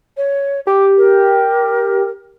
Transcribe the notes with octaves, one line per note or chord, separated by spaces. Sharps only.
C#5
G4 D6
A#4